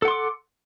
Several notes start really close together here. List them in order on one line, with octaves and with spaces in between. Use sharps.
A4 F#5 C6 D6